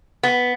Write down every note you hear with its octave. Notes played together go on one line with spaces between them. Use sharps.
B3